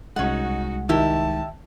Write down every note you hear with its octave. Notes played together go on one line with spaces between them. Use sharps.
C2 G#3 C#4 D#4 F#4 F#5
D#3 E4 G4 A5